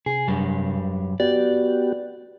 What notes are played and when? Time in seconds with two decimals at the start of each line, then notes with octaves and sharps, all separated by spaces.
0.06 C3 G#4
0.28 F#2 G3
1.20 B3 F#4 G4 D5